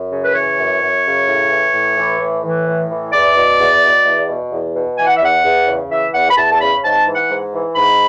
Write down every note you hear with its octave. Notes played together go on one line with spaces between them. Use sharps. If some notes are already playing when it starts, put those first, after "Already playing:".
Already playing: F#2
C#3
B4
E3 C#5
F#2
F#2
C#3
A2
E3
A2
E3
A2
E3
A2
E3
E2 D5
B2
E2
B2
E2
B2
E2
B2
E3 G#5
F#5
E5
E2 F#5
E2
C#3
E3 E5
E2 F#5
B5
E2 A5
A5
C#3 B5
G#2 A5
E3
F#5
G#2
E3
G#2 B5